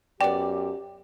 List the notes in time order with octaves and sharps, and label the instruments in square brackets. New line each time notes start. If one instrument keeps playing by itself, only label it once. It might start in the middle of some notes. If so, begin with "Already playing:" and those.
[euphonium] F#2 [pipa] B3 D5 [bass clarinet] G4 [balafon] G5